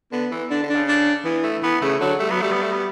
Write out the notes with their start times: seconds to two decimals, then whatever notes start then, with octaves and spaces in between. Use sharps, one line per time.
0.12 D3 B3
0.32 E3
0.50 D3 D4
0.63 D3
0.69 D4
0.75 C#3
0.88 D4
1.25 E3 B3
1.44 A3
1.63 E3 B3
1.81 C#3 A3
2.00 D3 F#3
2.19 G3 A3
2.31 F#3 B3
2.41 G3 A3
2.52 B3
2.63 A3
2.72 B3